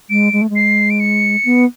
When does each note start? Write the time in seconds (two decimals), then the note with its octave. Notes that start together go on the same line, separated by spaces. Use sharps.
0.10 G#3 D7
0.33 G#3
0.41 A3
0.50 G#3
0.55 C7
0.90 D7
1.00 C#7
1.45 B3